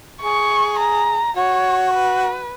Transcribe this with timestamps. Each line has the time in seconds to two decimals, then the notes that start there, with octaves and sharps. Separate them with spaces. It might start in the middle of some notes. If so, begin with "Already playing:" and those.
0.22 G#4 C#6
0.79 A#5
1.37 F#4 C#5
1.94 B4